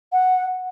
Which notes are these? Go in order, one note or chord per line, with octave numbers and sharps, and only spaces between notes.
F#5